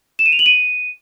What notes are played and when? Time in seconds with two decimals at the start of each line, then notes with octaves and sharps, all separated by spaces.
0.19 E7
0.26 D#7
0.32 F7
0.39 F#7
0.46 D#7